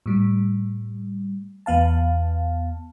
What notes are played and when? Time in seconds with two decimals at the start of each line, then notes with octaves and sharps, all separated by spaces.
0.06 A2 G3
1.66 E2 B3 F5 A5